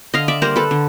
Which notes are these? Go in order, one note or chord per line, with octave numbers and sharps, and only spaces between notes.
D3 D#5 F5
D5 E5
G3 A#3 A#4 C5
A4 B4
D3